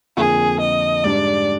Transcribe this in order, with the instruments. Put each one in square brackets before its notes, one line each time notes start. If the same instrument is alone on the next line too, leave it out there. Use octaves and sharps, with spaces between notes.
[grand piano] F2 D3 F3 A#3 [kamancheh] G#4
[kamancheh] D#5
[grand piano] G#2 G3 D4 [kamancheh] D5